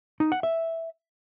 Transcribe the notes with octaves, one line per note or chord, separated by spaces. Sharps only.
D#4
F#5
E5